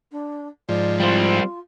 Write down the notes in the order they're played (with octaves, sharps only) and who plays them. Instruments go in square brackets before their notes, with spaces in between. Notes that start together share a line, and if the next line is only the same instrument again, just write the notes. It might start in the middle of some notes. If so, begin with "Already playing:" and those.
[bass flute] D4
[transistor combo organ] G#2 F3 [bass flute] D5
[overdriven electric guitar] G3 C4 [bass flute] F4